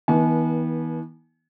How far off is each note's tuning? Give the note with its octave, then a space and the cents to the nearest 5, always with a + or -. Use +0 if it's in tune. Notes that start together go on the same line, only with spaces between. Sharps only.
E3 -45 B3 -25 G#5 +45